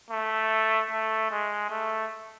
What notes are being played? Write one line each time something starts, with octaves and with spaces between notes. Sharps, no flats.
A3
A3
G#3
A3